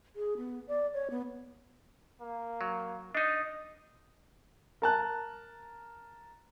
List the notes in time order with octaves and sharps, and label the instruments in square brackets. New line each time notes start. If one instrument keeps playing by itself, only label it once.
[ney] G#4
B3
D5
C#5
B3
[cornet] A#3
[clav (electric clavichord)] F#3
[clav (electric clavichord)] D4 D#4 [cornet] D#5
[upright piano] A#4 A5 F#6